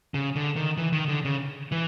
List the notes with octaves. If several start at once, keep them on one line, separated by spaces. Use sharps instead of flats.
C#3
D3
D#3
E3
D#3
D3
C#3
E3